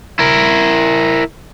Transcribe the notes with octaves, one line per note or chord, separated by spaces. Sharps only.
E4 A#4